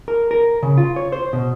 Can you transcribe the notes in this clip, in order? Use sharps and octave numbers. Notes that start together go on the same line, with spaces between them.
A#4
A#4
C#3
F4
C#5
C5
B2